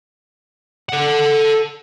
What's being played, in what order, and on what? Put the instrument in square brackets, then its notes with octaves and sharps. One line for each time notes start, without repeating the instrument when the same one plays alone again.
[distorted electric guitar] A4 F#5